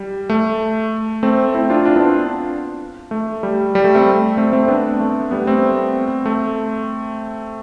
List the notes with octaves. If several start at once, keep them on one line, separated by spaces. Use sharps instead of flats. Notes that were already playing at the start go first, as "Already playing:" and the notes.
Already playing: G3
A3
A3 C4
C4 E4
D4 F4
D4 F4
B3 D4
A3
G3
G3
A3
A3 C4
A3 C4
A3 C4
B3 D4
A3
G3 B3
A3 C4
A3